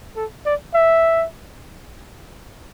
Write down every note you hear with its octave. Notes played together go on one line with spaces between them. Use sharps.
A4
D5
E5